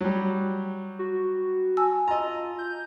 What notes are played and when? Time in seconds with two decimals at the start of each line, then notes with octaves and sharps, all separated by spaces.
0.01 F#3 G3
0.99 F#4
1.77 G#5 A5 E6
2.08 F4 D#5 A#5
2.58 G6